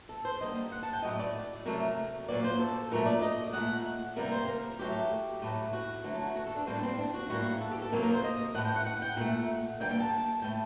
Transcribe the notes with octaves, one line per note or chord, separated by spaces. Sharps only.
A4
C5
D3 G3 A#3 D#5
F#5
A5
G5
A2 F#3 A3 D#5
D5
C3 F#3 A3 A#4
A#2 F#3 A#3 D5
C5
A4
A#2 F#3 A3 A#4
D5
D#5
A#2 A3 F#5
C3 G3 A#3 A#4
C5
A#4
A2 F#3 A3 G4
A2 F#3 A3
F#4
D3 F#3 A3
F#4
A4
D4
A2 G3 A#3 C4
D4
C4
D4
F#4
A2 G3 A#3 F#4
A4
G4
A4
C3 F#3 A#3 A#4
A#4
C5
D#5
A2 A3 F#5
G5
F#5
F#5
G5
A#2 A3 F#5
D3 G3 A#3 G5
G5
A5
A2 A3 G5